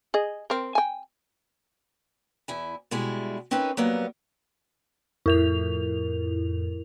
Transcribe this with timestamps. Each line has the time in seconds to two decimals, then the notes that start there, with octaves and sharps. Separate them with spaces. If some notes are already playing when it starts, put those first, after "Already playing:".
0.14 G#4 D#5
0.50 C4 A#4
0.75 G5 G#5
2.48 E2 E4 G#5
2.91 B2 G3 G#3 E4 G#5
3.51 C4 C#4 D#4 A#4 B4
3.77 F#3 G3 A#3 B3
5.26 F2 A2 E4 A#4 F7